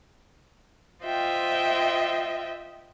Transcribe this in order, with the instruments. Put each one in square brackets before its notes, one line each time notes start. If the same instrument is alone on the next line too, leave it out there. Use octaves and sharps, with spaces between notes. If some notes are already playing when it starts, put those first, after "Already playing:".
[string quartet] F4 C5 D#5 E5 G5